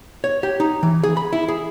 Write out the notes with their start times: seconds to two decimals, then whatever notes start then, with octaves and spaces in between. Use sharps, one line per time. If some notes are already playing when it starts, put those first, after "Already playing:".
0.24 C#5
0.43 G4
0.60 D#4
0.83 E3
1.03 G#4
1.17 B5
1.33 E4
1.48 G#4